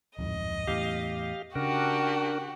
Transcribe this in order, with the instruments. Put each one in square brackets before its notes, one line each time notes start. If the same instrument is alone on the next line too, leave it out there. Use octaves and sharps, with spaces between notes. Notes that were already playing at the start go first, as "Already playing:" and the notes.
[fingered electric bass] D1 F2 G#2 [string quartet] D#5
[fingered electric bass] E2 A2 [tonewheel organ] G4 F5
[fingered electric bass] C#3 [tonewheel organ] D4 A#4 [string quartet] F#4 G4